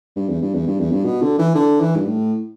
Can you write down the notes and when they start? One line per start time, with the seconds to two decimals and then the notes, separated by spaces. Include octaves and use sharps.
0.16 G2
0.29 E2
0.42 G2
0.54 E2
0.67 G2
0.80 E2
0.92 G2
1.05 B2
1.22 D3
1.39 E3
1.55 D3
1.81 E3
1.97 G2
2.06 A2